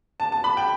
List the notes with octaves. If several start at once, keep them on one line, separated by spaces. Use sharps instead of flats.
A5
A5
B5
G5